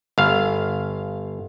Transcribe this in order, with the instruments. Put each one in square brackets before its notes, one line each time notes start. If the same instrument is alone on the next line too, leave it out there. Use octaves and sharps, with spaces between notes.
[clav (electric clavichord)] G1 F5